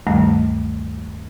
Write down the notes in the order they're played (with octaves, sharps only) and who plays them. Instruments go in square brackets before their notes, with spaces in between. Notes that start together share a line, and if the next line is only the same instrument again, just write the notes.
[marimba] D2 G2 D#3 G3 A3